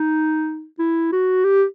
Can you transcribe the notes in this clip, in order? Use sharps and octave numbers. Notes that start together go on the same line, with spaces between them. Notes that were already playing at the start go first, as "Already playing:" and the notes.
Already playing: D#4
E4
F#4
G4